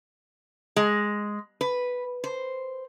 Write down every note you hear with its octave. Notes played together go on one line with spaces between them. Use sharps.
G#3
B4
C5